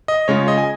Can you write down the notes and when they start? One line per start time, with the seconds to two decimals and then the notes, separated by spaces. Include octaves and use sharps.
0.08 D#5
0.28 C#3 G#3 C#4 F4 C#5
0.48 D#5
0.58 G#5